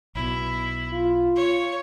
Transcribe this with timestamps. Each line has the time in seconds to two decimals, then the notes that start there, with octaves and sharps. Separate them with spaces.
0.15 B1 B2 E4
0.93 F4
1.36 C#5